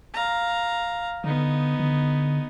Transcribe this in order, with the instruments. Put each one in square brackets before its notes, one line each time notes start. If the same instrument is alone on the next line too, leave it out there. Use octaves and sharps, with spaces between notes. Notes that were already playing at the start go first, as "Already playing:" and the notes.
[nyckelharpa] F5 A#5
[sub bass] D3 [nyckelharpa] B3 D#4
[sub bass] D3